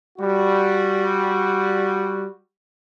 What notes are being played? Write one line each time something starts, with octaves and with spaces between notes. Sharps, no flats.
G3 F#4